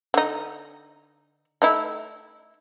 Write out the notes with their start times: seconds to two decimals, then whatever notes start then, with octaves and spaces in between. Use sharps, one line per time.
0.14 D3 D#4
1.62 A3 D#4 E4